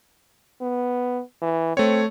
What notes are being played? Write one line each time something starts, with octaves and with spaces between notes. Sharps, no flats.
B3
E3
A3 C4 C#5